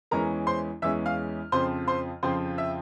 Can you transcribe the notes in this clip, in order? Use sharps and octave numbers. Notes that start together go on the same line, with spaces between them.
E2 E3 G#3 C#4 A#4 A#5
C5 C6
E2 E3 G#3 C#4 E5 E6
F5 F6
F2 C#3 F3 C4 C5 C6
C5 C6
F2 C#3 F3 C4 C5 C6
E5 E6